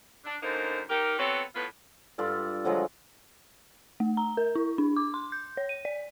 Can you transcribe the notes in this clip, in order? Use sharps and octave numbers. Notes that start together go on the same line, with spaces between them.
D4
F#2 D3 A#3 D#4 C5
D#4 G4 A#4
B3 C4 F#4 A4 B4 C#5
A2 B3 F4 B4
G2 F4 A4 D5
D3 F3 F#3 G#3
A3
A#5
A#4
E4
D4
D6
C6
G6
C#5
D#7
D5